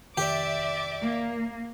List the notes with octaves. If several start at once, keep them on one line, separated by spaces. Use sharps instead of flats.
F1 D#3 G4 D5 E5 D6
A#3